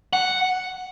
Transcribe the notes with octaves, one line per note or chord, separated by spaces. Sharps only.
F#5